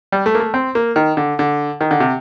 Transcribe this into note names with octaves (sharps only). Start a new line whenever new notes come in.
G3
A3
A#3
A3
C4
A#3
D#3
D3
D3
D#3
D3
C3